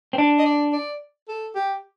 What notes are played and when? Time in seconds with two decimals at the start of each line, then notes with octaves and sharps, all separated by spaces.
0.13 C4
0.18 D4
0.38 D#5
0.46 D5
0.73 D5
1.28 A4
1.55 G4